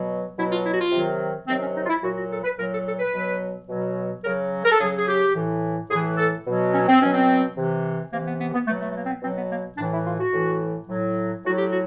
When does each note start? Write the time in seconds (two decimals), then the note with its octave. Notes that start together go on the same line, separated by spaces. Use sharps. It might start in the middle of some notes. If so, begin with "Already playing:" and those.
Already playing: B2 F#3
0.36 B2 F#3 E4
0.51 F4
0.65 E4
0.73 F#4
0.79 F4
0.92 C3 D#3 F#3
1.47 C3 D#3 F#3 C4
1.61 C#4
1.76 D#4
1.84 F4
1.89 E4
2.02 A#2 F#3 F#4
2.17 F#4
2.31 A4
2.44 B4
2.58 A#2 F#3 A#4
2.72 A4
2.86 A4
2.99 B4
3.14 B2 F#3
3.69 B2 F#3
4.24 C#3 F#3 A#4
4.65 A#4
4.72 A4
4.79 C#3 F#3 G#4
4.98 G#4
5.08 G4
5.34 A2 E3
5.90 A2 E3 G#4
6.18 A4
6.46 B2 F#3
6.74 C#4
6.88 C4
7.00 B2 F#3 C#4
7.12 C4
7.57 C3 E3
8.11 C3 E3 A#3
8.26 B3
8.40 B3
8.54 B3
8.67 B2 F#3 A3
8.81 A3
8.91 A3
8.95 A#3
9.05 C4
9.08 B3
9.22 B2 F#3 C4
9.36 B3
9.51 A#3
9.78 A2 D4
9.81 E3
9.92 E4
10.06 F4
10.20 F#4
10.33 A2 E3
10.88 A2 F#3
11.44 A2 F#3 F#4
11.57 G4
11.71 F#4